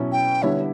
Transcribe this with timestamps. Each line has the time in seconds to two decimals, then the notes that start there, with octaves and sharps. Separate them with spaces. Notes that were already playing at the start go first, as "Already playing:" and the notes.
Already playing: B2 F#3 C#4 E4
0.12 G5
0.43 D3 G3 B3 E4 C#5